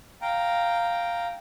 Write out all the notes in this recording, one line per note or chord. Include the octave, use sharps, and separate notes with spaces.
F5 G5 A#5